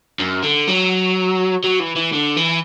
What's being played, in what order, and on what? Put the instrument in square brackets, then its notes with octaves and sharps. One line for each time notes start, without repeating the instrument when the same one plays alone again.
[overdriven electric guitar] F#2
D3
F#3
F#3
E3
E3
D3
E3